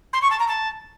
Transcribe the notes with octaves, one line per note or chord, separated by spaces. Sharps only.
C6
C#6
A5
A#5
A5